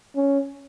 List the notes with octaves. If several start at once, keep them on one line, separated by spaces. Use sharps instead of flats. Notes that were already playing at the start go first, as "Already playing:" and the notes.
C#4